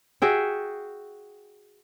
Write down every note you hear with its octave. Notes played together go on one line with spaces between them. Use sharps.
F#4 G#4 E5 G5